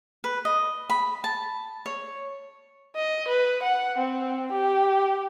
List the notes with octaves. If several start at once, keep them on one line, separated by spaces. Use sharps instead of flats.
B4
D#5
B5
A5
C#5
D#5
B4
F#5
C4
G4